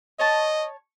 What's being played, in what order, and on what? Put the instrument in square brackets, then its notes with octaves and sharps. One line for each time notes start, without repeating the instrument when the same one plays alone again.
[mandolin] C#5 A5 [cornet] D#5